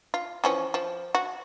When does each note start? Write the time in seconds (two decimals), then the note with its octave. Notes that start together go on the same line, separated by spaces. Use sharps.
0.14 F4
0.44 E3 F3 C#4
0.74 F3
1.15 F#4